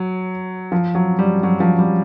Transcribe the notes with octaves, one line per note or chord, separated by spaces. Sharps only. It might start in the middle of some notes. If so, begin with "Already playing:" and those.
Already playing: F#3
F3
F#3
G3
F#3
F3
G3